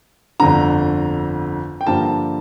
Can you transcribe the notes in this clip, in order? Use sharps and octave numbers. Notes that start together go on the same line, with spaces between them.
G1 F2 D3 A#5
G5
G2 D3 F3 A#3 A5